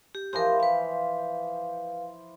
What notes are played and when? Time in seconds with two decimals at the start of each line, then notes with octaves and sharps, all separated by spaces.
0.15 G4
0.33 E3 F3 G4 A#4 C5
0.60 B4 F5